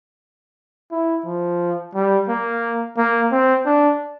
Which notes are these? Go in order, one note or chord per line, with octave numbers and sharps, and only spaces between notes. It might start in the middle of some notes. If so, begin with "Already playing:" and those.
E4
F3
G3
A#3
A#3
C4
D4